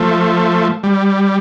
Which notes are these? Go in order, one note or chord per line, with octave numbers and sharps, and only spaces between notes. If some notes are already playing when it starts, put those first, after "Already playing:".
Already playing: F3 A3
G3